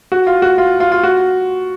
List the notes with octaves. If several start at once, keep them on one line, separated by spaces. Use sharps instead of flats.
F#4
F4
F#4
F4
F4
F4
F#4